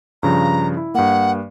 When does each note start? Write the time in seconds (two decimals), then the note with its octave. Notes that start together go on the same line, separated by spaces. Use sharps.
0.23 G2 C#3 F3 A#5
0.77 E4
0.95 G2 A#3 F#5